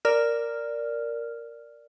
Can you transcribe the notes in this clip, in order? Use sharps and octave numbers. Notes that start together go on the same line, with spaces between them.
A#4 D5 F6